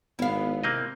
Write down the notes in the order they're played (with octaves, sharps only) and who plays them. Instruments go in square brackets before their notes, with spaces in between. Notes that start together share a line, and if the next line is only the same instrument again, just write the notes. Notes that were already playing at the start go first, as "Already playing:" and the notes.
[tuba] G#1 [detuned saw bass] B3 [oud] E4 F5
[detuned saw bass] C3 [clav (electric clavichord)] A#3 C4 D#5